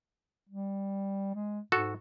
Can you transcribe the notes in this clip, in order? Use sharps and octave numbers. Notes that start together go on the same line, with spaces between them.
G3
G#3
G#2 F#4 A4